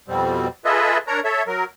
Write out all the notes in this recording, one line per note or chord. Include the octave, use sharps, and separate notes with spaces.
F2 B2 G3 C4
F4 G#4 A4 B4 D#5 E5
D4 A#4 C#5 A#5
A4 C#5 E5
F#3 A#4